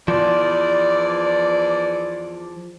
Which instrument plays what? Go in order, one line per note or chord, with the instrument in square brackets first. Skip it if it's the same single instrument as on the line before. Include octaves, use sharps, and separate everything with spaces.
[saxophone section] E2 D5 [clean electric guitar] F3